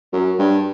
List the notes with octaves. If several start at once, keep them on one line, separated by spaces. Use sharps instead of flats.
F#2
G2